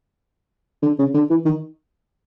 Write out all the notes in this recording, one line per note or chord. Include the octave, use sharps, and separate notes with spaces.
D3
C#3
D3
E3
D#3